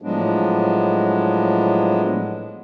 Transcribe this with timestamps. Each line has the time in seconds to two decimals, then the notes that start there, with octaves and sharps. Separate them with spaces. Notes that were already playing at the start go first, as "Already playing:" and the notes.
0.02 A2 F3 F#3 G#3 B3 D4